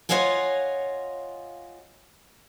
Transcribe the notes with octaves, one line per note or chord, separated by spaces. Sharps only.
F4 C#5 D#5 F5 F#5 G#5